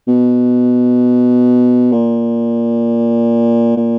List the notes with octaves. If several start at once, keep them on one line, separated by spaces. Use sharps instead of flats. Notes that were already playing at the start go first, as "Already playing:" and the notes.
B2
A#2
A#2